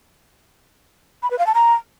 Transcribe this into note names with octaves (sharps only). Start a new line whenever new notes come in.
B5
B4
F5
A5
A#5